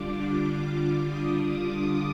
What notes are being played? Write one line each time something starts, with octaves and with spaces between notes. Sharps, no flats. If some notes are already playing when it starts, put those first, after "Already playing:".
Already playing: D3 G3 D4 F4 D6
D6
D#6
D6